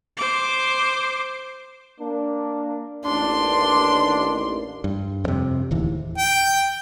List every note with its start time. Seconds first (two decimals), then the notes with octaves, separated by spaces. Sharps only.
0.17 C5 D6
2.00 A#3 D4
3.05 A1 D#2 D4 C6
4.84 G2
5.24 F2 C3
5.71 D1 D#2 E3
6.18 G5